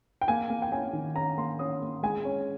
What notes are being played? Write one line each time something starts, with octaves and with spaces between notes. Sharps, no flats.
G5
A#3 G#5
A#3
G5
C#4 G#5
D#3
C#4 A#5
A#3 C6
C#4 D#6
A#3
G#3 G#5
C#4